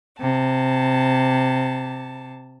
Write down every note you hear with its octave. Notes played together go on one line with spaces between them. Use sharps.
C3 A5